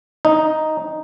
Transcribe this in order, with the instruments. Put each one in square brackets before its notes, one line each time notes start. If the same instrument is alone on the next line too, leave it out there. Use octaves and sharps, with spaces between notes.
[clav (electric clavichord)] D#4